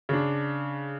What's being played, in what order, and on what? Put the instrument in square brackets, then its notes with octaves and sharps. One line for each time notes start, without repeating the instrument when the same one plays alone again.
[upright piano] C#3 D4